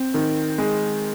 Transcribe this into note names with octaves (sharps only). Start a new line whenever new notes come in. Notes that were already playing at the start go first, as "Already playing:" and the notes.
Already playing: C4
D#3
G#3